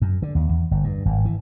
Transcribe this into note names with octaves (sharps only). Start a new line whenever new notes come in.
F#2
D3
D#2
E2
G1
G2
G#1
E3